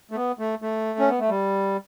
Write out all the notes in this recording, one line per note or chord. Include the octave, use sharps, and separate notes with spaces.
A3
B3
A3
A3
C#4
B3
A3
G3